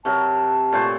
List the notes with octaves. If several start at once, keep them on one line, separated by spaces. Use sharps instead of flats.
C3 F#3 A#4 A5
A#2 A3 C5